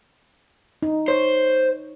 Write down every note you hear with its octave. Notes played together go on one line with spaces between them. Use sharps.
D#4
C5 C#5